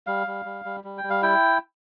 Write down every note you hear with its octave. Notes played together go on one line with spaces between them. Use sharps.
G3 F5
G3
G3
G3
G3
G5
G3
F5
E4 G5